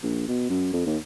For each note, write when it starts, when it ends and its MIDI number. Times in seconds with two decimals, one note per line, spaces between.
0.03 0.25 34
0.28 0.47 47
0.50 0.69 42
0.73 0.84 41
0.86 0.97 39